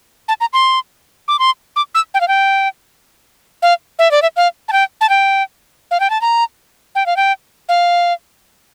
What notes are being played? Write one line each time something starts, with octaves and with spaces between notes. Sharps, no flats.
A5
A#5
C6
D6
C6
D6
E6
G5
F5
G5
F5
E5
D5
E5
F5
A5
G5
A5
G5
F5
G5
A5
A#5
G5
F5
G5
F5